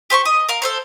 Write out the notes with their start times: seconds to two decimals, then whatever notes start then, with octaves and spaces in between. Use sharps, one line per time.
0.10 G4 C5 C6 C#6
0.25 D#5
0.49 A#4 F5
0.62 A4 C5 C#5